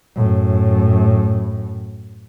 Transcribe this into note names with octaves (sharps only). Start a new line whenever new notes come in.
F#2 A2